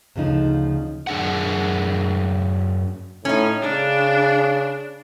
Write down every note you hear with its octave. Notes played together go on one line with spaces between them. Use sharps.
D2 C#3 F3 D#4
F#2 D4 G#4 F#5
A2 C#4 D#4
C#3 D4